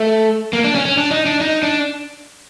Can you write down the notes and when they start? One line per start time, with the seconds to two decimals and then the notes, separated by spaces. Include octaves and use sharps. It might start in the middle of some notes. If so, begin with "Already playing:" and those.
Already playing: A3
0.53 A#3
0.64 D4
0.75 C#4
0.86 C#4
0.97 D4
1.11 D#4
1.26 D4
1.41 D#4
1.63 D4